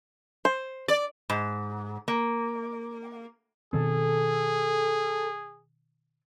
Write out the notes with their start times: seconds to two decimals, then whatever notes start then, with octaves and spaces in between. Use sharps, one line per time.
0.45 C5
0.88 D5
1.30 G#2
2.08 A#3
3.73 B2 D#3 C4 G#4 A4